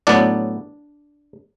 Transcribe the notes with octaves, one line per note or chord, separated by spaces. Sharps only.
A2 F#3 B3 D4 D5